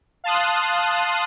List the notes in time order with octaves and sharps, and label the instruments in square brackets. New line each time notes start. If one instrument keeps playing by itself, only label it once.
[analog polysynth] F5 A5 C6 D#6 F#6